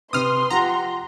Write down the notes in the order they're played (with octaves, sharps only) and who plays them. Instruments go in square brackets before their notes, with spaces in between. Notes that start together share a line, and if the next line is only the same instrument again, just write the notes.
[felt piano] C3 C4 C7 [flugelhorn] B4 [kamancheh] C6 [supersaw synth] D#6 F6
[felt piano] F3 F4 G4 [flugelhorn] F#5 [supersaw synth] A#5